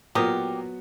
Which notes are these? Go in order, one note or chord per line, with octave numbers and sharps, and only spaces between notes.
A#2 F#3 B3 F#4 G4 A#4 D#6